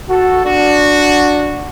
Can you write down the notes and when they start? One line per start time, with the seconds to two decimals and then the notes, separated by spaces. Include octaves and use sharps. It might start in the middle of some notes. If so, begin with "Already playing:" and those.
0.09 F#4 A4
0.45 D4 F#4